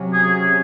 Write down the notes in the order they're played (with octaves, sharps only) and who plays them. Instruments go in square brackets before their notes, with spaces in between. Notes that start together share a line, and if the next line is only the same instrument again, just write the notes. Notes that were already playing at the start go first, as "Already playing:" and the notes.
Already playing: [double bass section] C3 F#3 C#4
[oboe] G#4
G#4